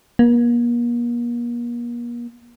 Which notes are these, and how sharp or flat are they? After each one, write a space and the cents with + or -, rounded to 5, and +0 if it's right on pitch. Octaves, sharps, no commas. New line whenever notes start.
A#3 +40